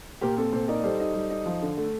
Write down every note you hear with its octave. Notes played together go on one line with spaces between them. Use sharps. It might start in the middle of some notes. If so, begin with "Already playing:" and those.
A#2 G4 A#4
C4 A4
A#2 A4 C5
D#4 A#4 D5
D5
G3 A4 C5
D#4
G3
D#4
F3
D3
A3